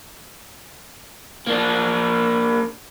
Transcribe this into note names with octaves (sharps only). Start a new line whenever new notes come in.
A#3 D4